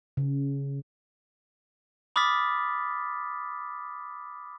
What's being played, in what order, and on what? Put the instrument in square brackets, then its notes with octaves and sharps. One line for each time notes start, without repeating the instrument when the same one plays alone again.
[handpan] C#3
[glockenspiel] B5 D6 D#6 F6 A6 B6